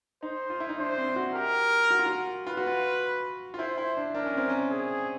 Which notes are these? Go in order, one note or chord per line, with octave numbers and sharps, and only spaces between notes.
D#4 C5
F4
E4
D#4
D4 C5
C4
F#4
G4 A#4
F#4
F4
F#4
F4 B4
F#4
F4
F4
E4 C5
E4
D4
D4 A#4
C#4
C4
C#4
G#4